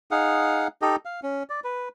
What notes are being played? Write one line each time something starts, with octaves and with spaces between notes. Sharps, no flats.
D#4 G#4 F5 F#5
D#4 G4 A4 D#5
F5
C#4
D5
B4